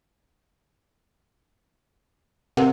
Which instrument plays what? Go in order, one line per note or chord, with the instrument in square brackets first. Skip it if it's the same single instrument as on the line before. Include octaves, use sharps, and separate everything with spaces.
[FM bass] C3 [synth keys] A#4 F#5